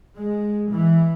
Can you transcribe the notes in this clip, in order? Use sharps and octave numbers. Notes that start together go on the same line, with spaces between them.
G#3
E3